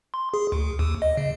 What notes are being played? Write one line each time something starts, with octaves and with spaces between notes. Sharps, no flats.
C6
G#4
D2
D#2
D#5
C#3